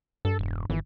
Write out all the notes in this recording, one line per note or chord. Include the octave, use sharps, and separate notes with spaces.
G2 A4
E1
G#1 E3